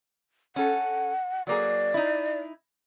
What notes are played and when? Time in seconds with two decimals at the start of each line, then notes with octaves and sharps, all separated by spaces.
0.56 C#4 A4 F#5
1.47 F#3 A#3 G#4 D5
1.94 D#4 E4